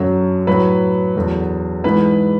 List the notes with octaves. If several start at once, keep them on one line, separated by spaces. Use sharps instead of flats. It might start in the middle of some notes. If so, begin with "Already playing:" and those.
Already playing: F#2 D3 F#3
A2 F#3 B4
E2 D3 F#3
G#2 E3 B4